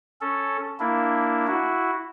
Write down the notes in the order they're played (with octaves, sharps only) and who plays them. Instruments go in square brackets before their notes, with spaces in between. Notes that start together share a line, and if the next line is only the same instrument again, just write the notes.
[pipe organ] C#4 A4
A#3 D4 E4
E4 F#4